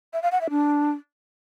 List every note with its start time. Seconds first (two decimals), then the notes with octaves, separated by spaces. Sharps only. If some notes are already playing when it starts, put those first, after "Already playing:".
0.13 E5
0.22 F5
0.32 F#5
0.41 E5
0.50 D4